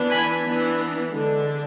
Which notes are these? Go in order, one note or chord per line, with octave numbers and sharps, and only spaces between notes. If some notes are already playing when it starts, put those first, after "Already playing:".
Already playing: E3 B3 D4
G#5 B5
E3 B3 D4
D3 G#3 D4